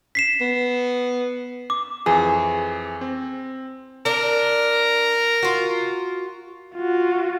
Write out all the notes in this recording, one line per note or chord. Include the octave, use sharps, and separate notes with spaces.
B6 C7 E7
B3
D6
F2 E3 G#4
C4
D4 A#4
F4 F#4
F4 F#4